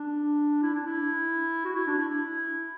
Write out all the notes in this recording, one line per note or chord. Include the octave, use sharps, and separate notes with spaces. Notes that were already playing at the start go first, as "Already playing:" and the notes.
Already playing: D4
E4
D4
E4
F#4
E4
D4
E4